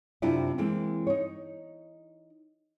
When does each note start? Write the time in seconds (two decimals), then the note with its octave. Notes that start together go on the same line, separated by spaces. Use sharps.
0.22 F#2 C3 C4 D4 E4 F4
0.58 E3 G#3 A#3 C4
1.07 D#4 C#5